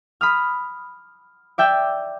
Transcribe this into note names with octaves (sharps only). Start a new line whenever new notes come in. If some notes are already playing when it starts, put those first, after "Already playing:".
B5 D#6 F6
D5 E5 G5